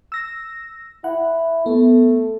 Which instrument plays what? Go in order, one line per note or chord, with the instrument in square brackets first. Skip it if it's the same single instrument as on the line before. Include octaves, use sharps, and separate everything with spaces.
[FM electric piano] E6 A#6
[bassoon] E4 [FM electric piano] F#5
[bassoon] A3 [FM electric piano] B3